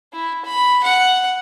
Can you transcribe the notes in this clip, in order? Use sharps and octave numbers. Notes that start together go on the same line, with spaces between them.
E4
B5
F#5